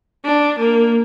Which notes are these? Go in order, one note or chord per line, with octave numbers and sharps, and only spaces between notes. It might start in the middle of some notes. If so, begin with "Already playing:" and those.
D4
A#3